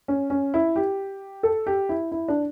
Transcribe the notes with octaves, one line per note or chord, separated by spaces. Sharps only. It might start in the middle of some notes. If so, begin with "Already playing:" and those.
C#4
C#4
E4
G4
A4
G4
E4
E4
D4